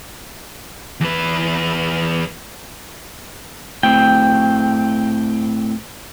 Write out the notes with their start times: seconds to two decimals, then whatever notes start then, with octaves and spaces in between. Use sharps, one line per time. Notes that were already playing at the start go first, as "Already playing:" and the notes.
1.00 E2 B4
3.83 A2 C4 G5